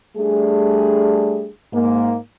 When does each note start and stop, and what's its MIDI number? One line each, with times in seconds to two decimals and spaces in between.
0.16 1.48 55
0.16 1.48 57
0.16 1.48 62
0.16 1.48 68
1.72 2.15 44
1.72 2.15 58